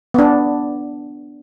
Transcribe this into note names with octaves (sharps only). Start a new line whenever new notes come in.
B3 D4